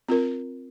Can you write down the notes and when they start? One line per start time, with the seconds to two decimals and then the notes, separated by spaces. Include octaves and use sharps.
0.09 C4 F4 A#4